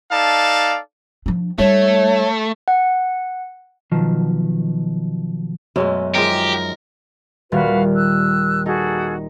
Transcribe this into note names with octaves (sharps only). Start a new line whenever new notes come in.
D#4 A4 D5 F5 A5
F3 D4
G3 A3 D#4 C#5
F#5
B2 D#3 F3 F#3
F#2 B2 G#3 A3
D#3 F3 G#3 G4 A#4
D#1 G3 F#4 B4 F5 F6
E6 F#6
D#4 F#4 G#4 A4